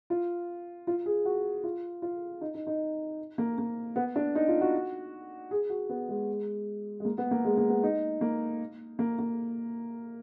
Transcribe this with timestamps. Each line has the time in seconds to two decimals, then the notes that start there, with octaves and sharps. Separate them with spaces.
0.10 F4
0.87 F4
1.06 G#4
1.25 F#4
1.64 F4
2.02 F4
2.41 D#4
2.54 D#4
2.67 D#4
3.38 A#3
3.58 A#3
3.96 B3
4.16 D4
4.35 D#4
4.48 F4
4.61 F#4
5.51 G#4
5.70 F#4
5.89 B3
6.09 G#3
7.00 G#3
7.05 A#3
7.18 B3
7.31 A#3
7.44 G#3
7.57 A#3
7.69 B3
7.83 D#4
8.21 A#3
8.99 A#3
9.19 A#3